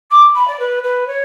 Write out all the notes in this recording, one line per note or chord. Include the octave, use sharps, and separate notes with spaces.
D6
B5
D5
B4
B4
C#5